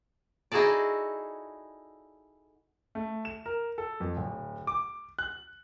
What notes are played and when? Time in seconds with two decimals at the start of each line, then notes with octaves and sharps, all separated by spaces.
0.52 D#4 E4 F#4 G#4 A4 D5
2.95 A3
3.25 E7
3.46 A#4
3.78 A4
4.00 F2
4.17 D1
4.67 D6
5.19 F#6